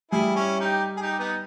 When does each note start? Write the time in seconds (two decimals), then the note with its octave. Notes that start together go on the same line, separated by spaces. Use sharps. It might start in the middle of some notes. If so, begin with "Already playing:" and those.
0.12 G3 E4 G#4
0.36 C#4 E4
0.60 D#4 G4
0.97 G#4
1.01 D#4 G4
1.19 B3 D#4